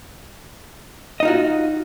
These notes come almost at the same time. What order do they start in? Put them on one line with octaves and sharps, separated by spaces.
D#5 D#4 F4 F#4